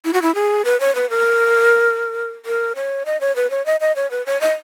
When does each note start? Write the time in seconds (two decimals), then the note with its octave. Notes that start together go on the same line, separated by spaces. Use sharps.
0.05 E4
0.13 F#4
0.22 E4
0.35 G#4
0.65 B4
0.80 C#5
0.95 B4
1.10 A#4
2.45 A#4
2.76 C#5
3.06 D#5
3.21 C#5
3.36 B4
3.50 C#5
3.66 D#5
3.80 D#5
3.96 C#5
4.11 B4
4.26 C#5
4.41 D#5